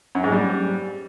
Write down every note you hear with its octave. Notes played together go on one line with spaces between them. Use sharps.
F#2
G#2
G3